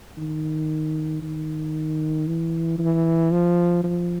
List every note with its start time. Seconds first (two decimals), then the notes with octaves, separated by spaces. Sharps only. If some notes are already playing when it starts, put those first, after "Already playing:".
0.18 D#3
1.22 D#3
2.27 E3
2.79 E3
3.32 F3
3.84 F3